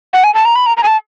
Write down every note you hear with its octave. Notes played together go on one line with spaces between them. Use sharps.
F#5
G#5
A5
A#5
B5
A#5
A#5
G#5
A5